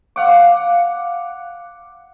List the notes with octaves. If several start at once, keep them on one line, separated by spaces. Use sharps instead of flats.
F5 F#5 D6